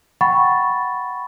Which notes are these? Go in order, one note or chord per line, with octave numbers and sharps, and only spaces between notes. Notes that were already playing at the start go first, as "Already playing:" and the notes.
F#5 G5 B5 C#6 A6